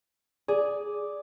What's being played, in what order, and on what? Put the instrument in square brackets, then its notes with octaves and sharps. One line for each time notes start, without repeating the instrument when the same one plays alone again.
[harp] G#4 [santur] D5